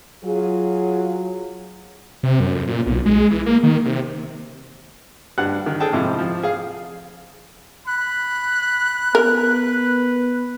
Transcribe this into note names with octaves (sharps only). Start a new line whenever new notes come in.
F#3 F4 G#4
C3
F#2
F2
A#2
B1
G#3
E3
A#3
D#3
C3
G2 G3 F#5 F#6
D#3
G#4 A4 G5 A5
G#2 C3 F3 E4
F3
G#4 F5
B5 F#6
B3 A#4 B4